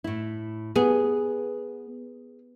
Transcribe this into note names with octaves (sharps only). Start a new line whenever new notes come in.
A2 E4
B3 G#4